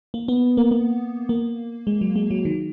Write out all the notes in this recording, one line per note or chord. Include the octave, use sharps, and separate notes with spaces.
A#3
B3
A#3
A#3
A#3
G#3
F#3
G#3
F#3
D#3